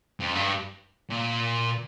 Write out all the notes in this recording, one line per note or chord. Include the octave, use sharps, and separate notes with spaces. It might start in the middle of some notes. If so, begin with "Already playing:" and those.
F2
G2
A#2